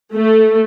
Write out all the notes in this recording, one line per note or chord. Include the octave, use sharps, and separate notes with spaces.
A3